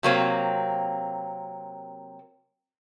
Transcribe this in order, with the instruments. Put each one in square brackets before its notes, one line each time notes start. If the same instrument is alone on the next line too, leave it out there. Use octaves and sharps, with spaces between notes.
[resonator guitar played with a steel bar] C3 F#3 A#3 C4